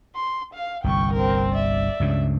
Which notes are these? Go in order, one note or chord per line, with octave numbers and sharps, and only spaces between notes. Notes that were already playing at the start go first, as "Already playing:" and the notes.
C6
F5
G1 C2 G5 C#6
C4 A#4
D5 E5
C#2 G2 C#3